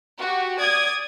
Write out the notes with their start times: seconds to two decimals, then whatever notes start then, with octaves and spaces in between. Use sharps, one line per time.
0.18 F#4 G4
0.60 D5 D#6 G#6